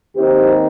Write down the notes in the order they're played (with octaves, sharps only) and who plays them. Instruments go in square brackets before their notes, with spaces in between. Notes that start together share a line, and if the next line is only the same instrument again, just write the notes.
[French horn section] D#2 D#3 C4 D#4 G4 C5